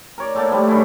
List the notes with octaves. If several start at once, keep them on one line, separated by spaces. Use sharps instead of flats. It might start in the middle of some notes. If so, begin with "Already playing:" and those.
A#4 C#5 D5
A2 A3 A#3 A5
A2 F3 G3
G2 D#3 C#4 E4